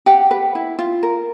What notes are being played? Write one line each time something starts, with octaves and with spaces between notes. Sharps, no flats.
G4 F#5
B4
E4
F4
A#4